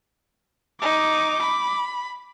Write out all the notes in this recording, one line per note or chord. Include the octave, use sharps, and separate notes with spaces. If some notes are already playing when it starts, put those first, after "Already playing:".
D#4 D6
B5